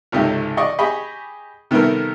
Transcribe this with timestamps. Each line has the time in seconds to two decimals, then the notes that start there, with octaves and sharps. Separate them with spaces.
0.12 G#1 C#2 C3 A3 D#4 G4
0.57 D5 D#5 C#6
0.78 G4 G#4 D#5 B5 C#6
1.71 C3 D#3 G3 A3 B3 A#4